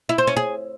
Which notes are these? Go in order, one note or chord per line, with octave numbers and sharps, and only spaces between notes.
E4
C5
C#4
G#4